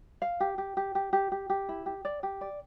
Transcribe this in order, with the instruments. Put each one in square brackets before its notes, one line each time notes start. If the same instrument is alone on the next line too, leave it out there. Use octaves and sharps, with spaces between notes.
[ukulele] F5
G4
G4
G4
G4
G4
G4
G4
E4
G4
D5
G4
D5